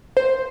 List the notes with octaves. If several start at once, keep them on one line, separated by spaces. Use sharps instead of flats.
C5